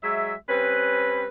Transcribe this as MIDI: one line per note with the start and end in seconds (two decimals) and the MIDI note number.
0.04 0.33 54
0.04 0.33 56
0.04 0.33 76
0.49 1.27 55
0.49 1.27 60
0.49 1.27 61
0.49 1.27 71